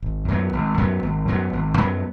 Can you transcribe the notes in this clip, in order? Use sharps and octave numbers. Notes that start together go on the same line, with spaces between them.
G#1
F#2 F#3 B3
G#1
F#2 F#3 B3
G#1
F#2 F#3 B3
G#1
F#2 F#3 B3